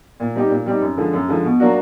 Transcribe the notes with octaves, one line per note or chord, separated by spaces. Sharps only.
A#2
G3 C4 D#4 G4
A#2
G3 C4 D#4 G4
F#2
D3 F3 G#3
F#2
D3 F3 G#3
B2
F#3 A#3 D4 F#4